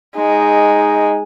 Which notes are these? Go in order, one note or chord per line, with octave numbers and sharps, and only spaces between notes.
G#3 D#4